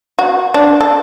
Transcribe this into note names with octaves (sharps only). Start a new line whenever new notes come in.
F#4
D4
A4